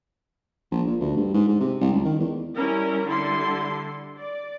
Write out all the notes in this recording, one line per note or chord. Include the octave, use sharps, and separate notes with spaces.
A#1
A#2
D2
G2
G#2
G#2
C3
C2
C#2
D#3
E2
G3 C#4 E4 A#4
D3 G3 E4 A4 C6
D5